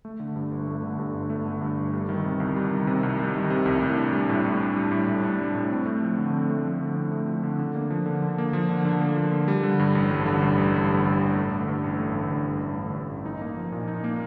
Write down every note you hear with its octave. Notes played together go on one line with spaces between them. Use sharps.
A3
D3
G2
G1
A3
D3
G2
G1
A3
D3
G2
G1
G3
D#3
C3
C2
G3
D#3
C3
C2
G3
D#3
C3
C2
A2
D4
G3
A2
A2
D4
G3
A2
A2
D4
G3
A2
C4
A3
F3
D3
C4
A3
F3
D3
C4
A3
F3
D3
D3
A#3
F3
D3
D3
A#3
F3
D3
D3
A#3
F3
D3
G3
D3
G2
A1
G3
D3
G2
A1
G3
D3
G2
A1
A3
D3
G2
A1
A3
D3
G2
A1
A3
D3
G2
A1
D#4
A#3
F3
A#2
D#4
A#3